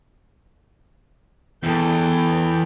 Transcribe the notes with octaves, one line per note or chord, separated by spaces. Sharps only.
E2 A4 G5